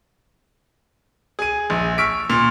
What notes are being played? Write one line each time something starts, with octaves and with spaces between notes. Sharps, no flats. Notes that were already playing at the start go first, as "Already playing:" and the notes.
G#4 D#7
A#1
C#6 E6 F6 B6 D7
A#2 F7